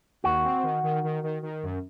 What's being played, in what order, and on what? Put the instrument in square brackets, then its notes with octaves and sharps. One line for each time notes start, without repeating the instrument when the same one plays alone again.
[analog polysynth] D#2 [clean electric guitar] F#4
[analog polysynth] C4
D#3
D#3
D#3
D#3
D#3
F#2